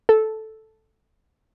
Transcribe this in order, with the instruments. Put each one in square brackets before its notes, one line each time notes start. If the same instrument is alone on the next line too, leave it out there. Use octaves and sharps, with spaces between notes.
[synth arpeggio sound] A4